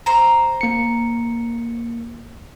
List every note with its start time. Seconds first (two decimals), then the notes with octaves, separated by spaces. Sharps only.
0.06 C5 A#5
0.61 A#3 C#7